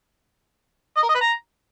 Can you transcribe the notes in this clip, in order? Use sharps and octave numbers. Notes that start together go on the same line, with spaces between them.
D#5
A#4
D#5
B4
A#5